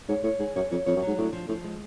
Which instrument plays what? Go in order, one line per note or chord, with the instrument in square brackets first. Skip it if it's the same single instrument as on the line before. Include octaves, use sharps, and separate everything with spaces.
[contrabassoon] G#2 [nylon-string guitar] C#5
[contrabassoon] A2 [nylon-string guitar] C#5
[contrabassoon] G#2 [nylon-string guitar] G#4
[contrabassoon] F#2 [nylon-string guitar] C#5
[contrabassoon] F2 [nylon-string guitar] C#5
[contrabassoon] F2 [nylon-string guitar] C#5
[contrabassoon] F#2
[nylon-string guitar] F#3
[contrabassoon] G#2
[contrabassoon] A2 [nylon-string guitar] D4
[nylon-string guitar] F3
[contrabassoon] A2 [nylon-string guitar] F3
[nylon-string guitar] G#3